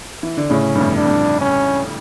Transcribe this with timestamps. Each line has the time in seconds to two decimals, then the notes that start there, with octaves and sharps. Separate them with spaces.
0.23 E3
0.37 D3
0.50 A2 C#3 C#4
0.75 G2
0.80 F2 A2
0.96 D4
1.05 F2
1.11 G2
1.41 C#4